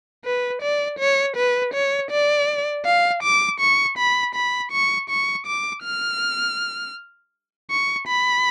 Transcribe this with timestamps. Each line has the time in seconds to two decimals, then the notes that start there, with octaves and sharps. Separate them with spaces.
0.25 B4
0.62 D5
0.99 C#5
1.37 B4
1.74 C#5
2.11 D5
2.85 F5
3.23 D6
3.60 C#6
3.98 B5
4.35 B5
4.72 C#6
5.10 C#6
5.47 D6
5.84 F6
7.71 C#6
8.08 B5